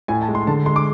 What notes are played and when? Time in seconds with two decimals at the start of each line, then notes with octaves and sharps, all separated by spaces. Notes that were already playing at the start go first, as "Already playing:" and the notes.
0.08 A2 G#5
0.22 A5
0.29 G#3
0.35 C6
0.47 D3 A5
0.66 G#3 C6
0.76 D6